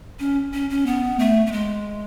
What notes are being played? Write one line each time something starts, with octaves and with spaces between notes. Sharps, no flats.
C#4
C#4
C#4
B3
A3
A3
G#3